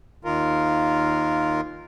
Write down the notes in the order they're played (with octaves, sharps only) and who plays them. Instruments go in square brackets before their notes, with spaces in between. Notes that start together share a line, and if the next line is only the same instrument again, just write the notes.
[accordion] D#2 D#3 F4 A#4